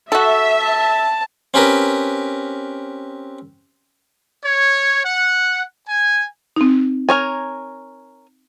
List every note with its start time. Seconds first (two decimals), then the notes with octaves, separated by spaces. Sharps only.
0.12 F#4 A4 E5
0.62 A5
1.54 C4 C#4 G4 A#4 B4
4.42 C#5
5.04 F#5
5.87 G#5
6.56 C4 D#4
7.09 A#4 C#5 G#5